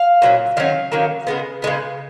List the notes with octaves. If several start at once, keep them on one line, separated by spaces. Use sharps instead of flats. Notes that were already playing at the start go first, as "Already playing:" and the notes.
Already playing: F5
A#2 F#3 A#3 C#4
D#3 F#3 C#4 F5
D#3 F#3 A#3 C#4
C#3 G#3 B3
C#3 G#3 B3